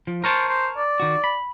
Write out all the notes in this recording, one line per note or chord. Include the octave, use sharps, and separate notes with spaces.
F3
A#4 C5 C#5 A5
C5
D5
D#3 F#4
B5